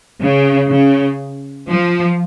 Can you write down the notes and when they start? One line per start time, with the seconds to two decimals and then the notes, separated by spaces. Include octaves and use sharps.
0.20 C#3
0.69 C#3
1.69 F3